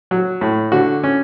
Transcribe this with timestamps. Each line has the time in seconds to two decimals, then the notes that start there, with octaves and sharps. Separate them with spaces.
0.11 F#3
0.41 A2
0.72 D3 F#4
1.04 C#4